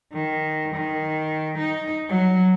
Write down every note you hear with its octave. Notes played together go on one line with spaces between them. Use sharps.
D#3
D#3
D#4
F#3